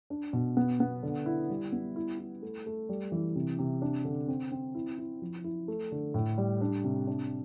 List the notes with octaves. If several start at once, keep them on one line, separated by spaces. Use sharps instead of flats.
D4
B2
B3
B3
D3
E4
G3
B3
E4
E4
A3
A3
G3
E3
C3
C3
D4
D3
C4
C4
E4
E4
F3
E4
A3
D3
A2
G3
D4
C3
D4